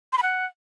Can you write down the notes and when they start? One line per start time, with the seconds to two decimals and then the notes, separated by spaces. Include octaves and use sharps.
0.13 C6
0.18 B5
0.23 F#5